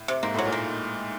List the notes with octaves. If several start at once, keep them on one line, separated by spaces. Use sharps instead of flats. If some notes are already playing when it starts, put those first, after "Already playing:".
Already playing: A2
C3
G#2 A#3
A2 F#3
A#2
A#3